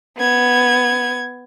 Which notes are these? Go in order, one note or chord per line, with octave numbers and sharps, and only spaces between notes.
B3 G#6